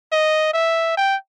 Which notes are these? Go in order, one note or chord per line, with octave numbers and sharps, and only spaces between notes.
D#5
E5
G5